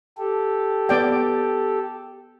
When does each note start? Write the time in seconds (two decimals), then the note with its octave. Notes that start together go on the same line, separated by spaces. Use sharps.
0.18 G4 A4
0.89 B3 D5 G5